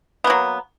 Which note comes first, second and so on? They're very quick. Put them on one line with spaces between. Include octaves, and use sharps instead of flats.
B3 A#3 F#3